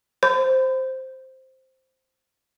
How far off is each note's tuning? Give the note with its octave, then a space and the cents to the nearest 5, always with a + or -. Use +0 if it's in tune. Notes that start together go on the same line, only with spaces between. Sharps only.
C5 +0 B5 +45